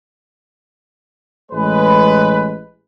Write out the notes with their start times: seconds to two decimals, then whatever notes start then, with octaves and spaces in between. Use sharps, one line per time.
1.52 A1 G#3 B4